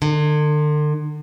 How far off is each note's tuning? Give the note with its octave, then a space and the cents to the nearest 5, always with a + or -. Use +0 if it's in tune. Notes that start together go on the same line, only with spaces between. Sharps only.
D3 +40